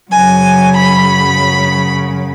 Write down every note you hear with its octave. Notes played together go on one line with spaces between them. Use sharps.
F#2 C#3 F#3 G#5
B5